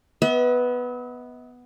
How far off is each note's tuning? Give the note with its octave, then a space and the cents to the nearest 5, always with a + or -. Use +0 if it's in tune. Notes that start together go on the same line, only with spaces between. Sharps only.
B3 +0 E5 -45